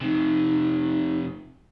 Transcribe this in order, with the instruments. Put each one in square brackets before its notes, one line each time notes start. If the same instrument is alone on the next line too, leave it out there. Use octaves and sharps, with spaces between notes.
[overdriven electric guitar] F2 C3 [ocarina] D#4